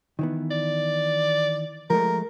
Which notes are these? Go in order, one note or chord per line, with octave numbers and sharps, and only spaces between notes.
D#3 E3 B3
D5
F3 G#3 A3 A#4